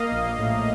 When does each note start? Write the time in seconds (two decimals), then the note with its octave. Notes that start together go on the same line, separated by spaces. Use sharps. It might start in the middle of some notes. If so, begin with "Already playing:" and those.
Already playing: A#3 D#5 F5
0.11 A#1
0.38 A2